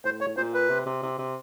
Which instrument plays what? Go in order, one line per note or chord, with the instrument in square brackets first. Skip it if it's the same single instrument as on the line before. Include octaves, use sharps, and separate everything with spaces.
[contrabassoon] A2 [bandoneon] C5
[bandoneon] C#5
[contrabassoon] A2
[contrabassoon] A#2 [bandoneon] C5
[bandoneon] B4
[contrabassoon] C3
C3
C3
C3